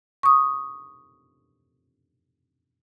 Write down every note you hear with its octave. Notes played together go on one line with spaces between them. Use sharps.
C#6 D#6